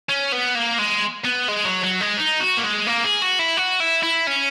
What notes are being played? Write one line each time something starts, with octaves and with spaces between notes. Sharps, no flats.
C#4
B3
A#3
G#3
B3
G#3
F#3
F#3
G#3
D#4
F#4
A#3
G#3
A#3
G#4
F#4
E4
F#4
E4
E4
C#4